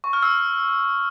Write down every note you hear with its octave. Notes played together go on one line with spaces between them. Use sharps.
C#6
F6
E6